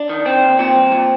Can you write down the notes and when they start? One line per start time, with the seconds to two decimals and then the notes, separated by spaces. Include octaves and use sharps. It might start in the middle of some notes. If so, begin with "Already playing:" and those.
Already playing: D4
0.09 D#3
0.25 D#3 C4
0.42 D#2
0.59 A#2 C4
0.75 C2
0.92 A#2